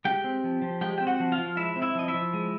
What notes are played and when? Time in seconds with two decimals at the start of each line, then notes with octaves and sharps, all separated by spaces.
0.05 G#3 G4 G5
0.24 C4
0.44 F3
0.62 F3
0.81 G#3 G4 G5
0.98 C4 G5
1.07 F#4 F#5
1.20 F3
1.32 F4 F5
1.38 F3
1.57 G#3 E4 E5
1.76 C4
1.82 E4 E5
1.95 F3 D#5
2.08 E4 E5
2.14 F3
2.34 G#3